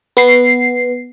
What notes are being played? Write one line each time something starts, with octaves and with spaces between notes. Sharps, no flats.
B3 C7